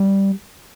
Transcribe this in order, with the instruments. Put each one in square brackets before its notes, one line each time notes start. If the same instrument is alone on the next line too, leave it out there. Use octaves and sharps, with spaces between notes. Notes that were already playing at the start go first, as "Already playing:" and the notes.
Already playing: [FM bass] G3